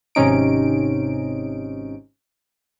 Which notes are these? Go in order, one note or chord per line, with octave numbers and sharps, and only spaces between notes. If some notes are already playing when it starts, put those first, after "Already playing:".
G#1 C3 C#4 D#4 D7